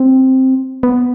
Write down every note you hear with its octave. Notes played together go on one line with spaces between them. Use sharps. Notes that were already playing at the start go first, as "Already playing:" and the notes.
Already playing: C4
B3